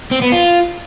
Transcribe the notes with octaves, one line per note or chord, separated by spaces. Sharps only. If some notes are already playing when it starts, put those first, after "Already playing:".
C4
B3
F4